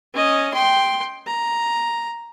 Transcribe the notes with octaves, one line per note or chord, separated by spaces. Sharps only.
C#4 D#5
G5 C6
A#5